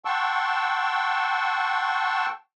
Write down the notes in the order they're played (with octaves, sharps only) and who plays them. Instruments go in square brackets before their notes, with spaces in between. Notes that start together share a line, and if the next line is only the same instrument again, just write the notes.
[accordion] F#5 G5 A5 C6 C#6 E6